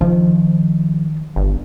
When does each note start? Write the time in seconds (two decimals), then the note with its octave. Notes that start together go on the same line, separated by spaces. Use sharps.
0.01 D#3 F3
1.36 G1